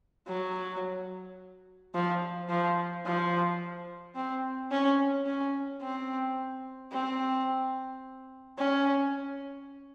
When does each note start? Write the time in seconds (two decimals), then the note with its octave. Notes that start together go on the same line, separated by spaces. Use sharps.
0.28 F#3
1.95 F3
2.49 F3
3.05 F3
4.16 C4
4.71 C#4
5.26 C#4
5.82 C4
6.92 C4
8.58 C#4